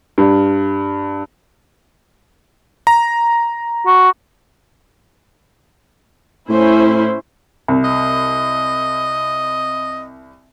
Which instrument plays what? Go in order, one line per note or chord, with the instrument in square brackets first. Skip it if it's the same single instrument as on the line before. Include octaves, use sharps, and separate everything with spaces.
[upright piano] G2
[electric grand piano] A#5
[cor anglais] F#4
[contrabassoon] A2 [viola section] C#4 E4 C5
[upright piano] C2
[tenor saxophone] D#5